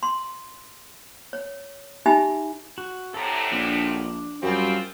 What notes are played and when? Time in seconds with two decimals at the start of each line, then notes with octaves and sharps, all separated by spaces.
0.03 C6
1.33 C#5
2.06 D#4 G4 E5 G#5 B5
2.78 F#4
3.14 D2 A2 C3 A4 A#5
3.51 A#1 D4
4.43 F#2 G3 C4 F4